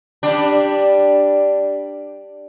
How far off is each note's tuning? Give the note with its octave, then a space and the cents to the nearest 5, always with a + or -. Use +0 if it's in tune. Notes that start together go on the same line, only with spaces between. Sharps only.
G3 +0 D4 +0